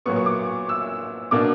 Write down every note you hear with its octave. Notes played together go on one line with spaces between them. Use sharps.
A#2 F#3 B3 C#6
C#6
D6
E6
B2 A#3 D4 D6